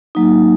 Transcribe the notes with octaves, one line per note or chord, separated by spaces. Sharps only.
F#3 A#3 D#4